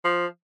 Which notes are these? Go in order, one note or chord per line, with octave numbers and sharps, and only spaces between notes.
F3